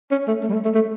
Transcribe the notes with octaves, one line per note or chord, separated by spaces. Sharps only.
C#4
A3
A3
G3
A3
A3
A3